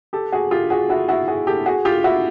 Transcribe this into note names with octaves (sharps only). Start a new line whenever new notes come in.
G4 A4
F#4 G#4
F4 G4
F#4 G#4
E4 F#4
E4 F#4
F#4 G#4
G4 A4
F#4 G#4
F4 G4
E4 F#4